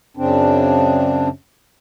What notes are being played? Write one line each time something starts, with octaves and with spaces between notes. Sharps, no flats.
F#2 C#3 C4 D4